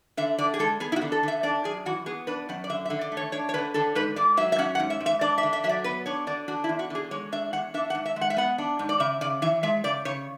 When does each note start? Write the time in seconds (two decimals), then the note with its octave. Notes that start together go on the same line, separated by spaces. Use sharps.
0.17 D3 E5
0.38 D3 D5
0.54 G#4
0.59 G#3 A4
0.80 B3 G#4
0.92 E4
0.96 F#4
1.01 D3
1.12 A4
1.23 D3 E5
1.43 D4 D5
1.64 F#2 G#4
1.86 E3 F#4
2.06 B3 G#4
2.27 D4 B4
2.49 F#2 F#5
2.64 D5
2.70 D3 E5
2.85 E5
2.90 D3
3.01 D5
3.12 A3
3.17 C#5
3.32 D4 C#5
3.49 C#5
3.54 D3 B4
3.74 D3 A4
3.95 G#2 B4
4.16 G#2 D5
4.37 F#3 E5
4.52 E5
4.58 C#4 F#5
4.75 F#5
4.80 G#2
4.90 E5
5.01 G#2
5.06 E5
5.21 D4 D5
5.38 E5
5.43 D3
5.53 E5
5.64 F#3 E5
5.69 D5
5.84 B3 B4
6.06 D4 C#5
6.27 D3 D5
6.48 D4 F#4
6.64 E4
6.69 E2
6.79 F#4
6.90 D3 G#4
7.11 G#3 C#5
7.32 D4 E5
7.53 E2 F#5
7.74 D4 E5
7.90 F#5
7.95 G#2
8.06 E5
8.16 G#3
8.21 F#5
8.30 E5
8.37 B3 F#5
8.58 D4
8.79 G#2
8.89 D5
9.00 C#3 E5
9.21 C#3 D5
9.42 E3 E5
9.63 G#3 E5
9.84 C#3 D5
10.05 C#3 C#5